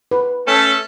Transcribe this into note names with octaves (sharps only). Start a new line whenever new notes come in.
B4
A3 C#4 A4